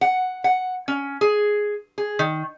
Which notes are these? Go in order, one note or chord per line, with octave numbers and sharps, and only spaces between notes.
F#5
F#5
C#4
G#4
G#4
D#3